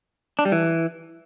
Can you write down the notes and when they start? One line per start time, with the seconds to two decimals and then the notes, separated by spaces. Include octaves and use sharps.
0.39 D4
0.45 G3
0.52 E3